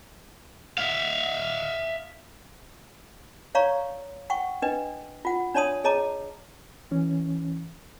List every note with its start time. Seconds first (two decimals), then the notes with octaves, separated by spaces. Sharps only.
0.78 E5 F5
3.55 C#5 D5 F5 A#5 C#6
4.30 F#5 G5 C#6
4.62 D4 B4 D#5 G5
5.25 F4 F#5
5.54 D4 C#5 D5 A5 C6 D#6
5.84 G#4 C#5 D#5 A5 A#5 D6
6.91 E3 C#4